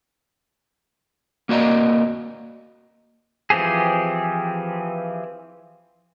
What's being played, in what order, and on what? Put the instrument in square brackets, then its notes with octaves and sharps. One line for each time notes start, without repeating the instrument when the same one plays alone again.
[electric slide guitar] A#3 F#4 D5 D#5 A#5
[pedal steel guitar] E3 F3 C4 G4 G#4